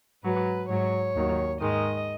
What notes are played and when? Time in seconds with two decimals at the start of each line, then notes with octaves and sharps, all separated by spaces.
0.23 G#2 F#3 B4
0.69 G#2 F#3 C#5
1.15 D#2 D#3 F#3
1.61 G#2 D#3 G#3 D#5